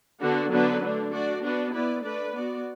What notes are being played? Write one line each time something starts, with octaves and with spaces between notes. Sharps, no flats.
D3 B3 D4 F#4 A4
D3 F#3 B3 D4 B4
D3 A3 D4
A3 D4 F#4 D5
B3 D4 F#4 B4
B3 E4 B4 D5
A3 D4 B4 D5
B3 F#4 D5